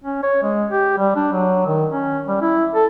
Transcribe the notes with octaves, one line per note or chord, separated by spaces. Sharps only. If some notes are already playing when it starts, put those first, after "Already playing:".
C#4
C#5
G#3
G4
G3
D4
F#3
D#3
C#4
G3
E4
A4